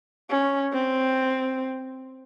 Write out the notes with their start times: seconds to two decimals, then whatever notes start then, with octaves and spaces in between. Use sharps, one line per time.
0.30 C#4
0.73 C4